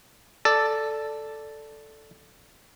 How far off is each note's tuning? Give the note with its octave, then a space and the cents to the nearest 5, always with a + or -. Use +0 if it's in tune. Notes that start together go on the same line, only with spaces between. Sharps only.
A4 +0 D5 +0